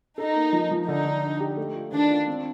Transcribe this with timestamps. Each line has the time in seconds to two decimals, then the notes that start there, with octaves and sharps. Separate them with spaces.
0.18 D#4 A4
0.36 A#3
0.53 F3
0.71 F3
0.88 D3 D#4
1.05 D3
1.24 D4
1.40 G4
1.57 A3
1.75 F4
1.92 D#3 D4
2.10 F4
2.27 C4